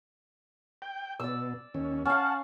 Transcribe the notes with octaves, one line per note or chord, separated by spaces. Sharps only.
G5
B2 D5 E6
D#2 C#4
C#4 F5 F#5 A5